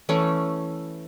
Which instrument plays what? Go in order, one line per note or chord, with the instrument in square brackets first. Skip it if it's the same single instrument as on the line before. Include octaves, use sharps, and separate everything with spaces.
[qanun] E3 A3 C#4